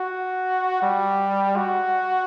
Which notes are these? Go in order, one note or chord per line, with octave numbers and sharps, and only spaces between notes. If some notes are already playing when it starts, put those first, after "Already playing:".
Already playing: F#4
G3
F#4